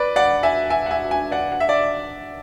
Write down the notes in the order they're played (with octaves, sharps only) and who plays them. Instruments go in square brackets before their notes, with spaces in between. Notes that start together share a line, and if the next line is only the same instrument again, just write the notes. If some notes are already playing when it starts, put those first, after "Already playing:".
Already playing: [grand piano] B4 D5
D5 F#5
E5 G#5
E5 G#5
F#5
E5 G#5
E5 G#5
D5 F#5
F#5
E5
D5